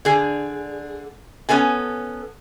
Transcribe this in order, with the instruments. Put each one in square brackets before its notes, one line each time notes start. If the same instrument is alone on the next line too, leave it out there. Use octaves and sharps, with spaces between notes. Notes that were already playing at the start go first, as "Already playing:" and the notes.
[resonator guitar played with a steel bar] D3 G#4
B3 C#4 A4 G#5